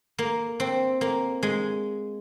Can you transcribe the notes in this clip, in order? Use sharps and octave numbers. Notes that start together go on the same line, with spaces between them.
A#3
C4
A#3
G#3